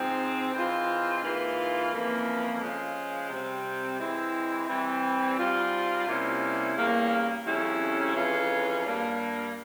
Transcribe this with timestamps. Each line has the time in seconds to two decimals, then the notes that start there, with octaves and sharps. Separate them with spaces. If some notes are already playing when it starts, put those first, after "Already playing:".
Already playing: G#2 F3 C4
0.54 E3 G#3 C4 F4
1.22 G#2 E3 A#3 F4
1.92 F2 E3 A#3 C#4
2.60 C#3 F3 G#3
3.30 C3 G3 C4
3.99 E3 G#3 C4 E4
4.68 E3 G3 C4
5.38 G#2 G3 C4 F4
6.06 C3 G3 A#3 C#4 E4
6.75 E2 C#3 G3 A#3
7.46 F2 C#3 G3 C#4 E4
8.14 F2 E3 G#3 C#4 F4
8.84 G2 G3 A#3